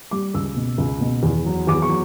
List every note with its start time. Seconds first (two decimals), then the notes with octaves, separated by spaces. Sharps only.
0.11 G3 D6
0.34 C#2 E6
0.56 B2
0.78 C#2
1.01 B2
1.23 E2
1.46 F#3
1.67 E2 D6
1.82 C#6
1.90 F#3